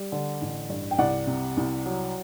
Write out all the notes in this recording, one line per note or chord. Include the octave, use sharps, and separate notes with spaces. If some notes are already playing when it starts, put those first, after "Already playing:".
Already playing: G3
D3
A1
G2
G5
C2 D5 F#5
C3
C2
F#3